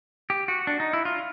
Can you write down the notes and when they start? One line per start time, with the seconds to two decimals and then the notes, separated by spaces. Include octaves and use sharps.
0.30 G4
0.48 F#4
0.67 D4
0.80 D#4
0.93 E4
1.05 F4